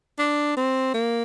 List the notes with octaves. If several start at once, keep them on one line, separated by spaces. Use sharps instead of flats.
D4
C4
A#3